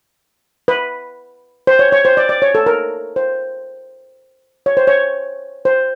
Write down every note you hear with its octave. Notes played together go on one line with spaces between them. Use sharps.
B4
C5
C#5
C#5
C5
D5
D5
C#5
A4
A#4
C5
C#5
C5
C#5
C5